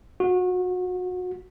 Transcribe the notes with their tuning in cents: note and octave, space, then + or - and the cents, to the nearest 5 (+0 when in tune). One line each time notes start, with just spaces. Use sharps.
F#4 -30